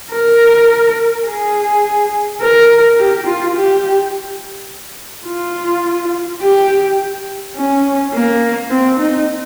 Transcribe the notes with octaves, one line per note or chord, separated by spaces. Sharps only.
A#4
G#4
A#4
G4
F4
G4
F4
G4
C#4
A#3
C4
D#4